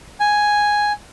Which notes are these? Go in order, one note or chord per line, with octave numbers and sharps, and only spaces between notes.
G#5